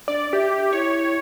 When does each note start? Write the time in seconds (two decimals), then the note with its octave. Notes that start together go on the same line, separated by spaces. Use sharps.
0.08 D4 D5
0.33 G4 E5
0.73 E4 C#5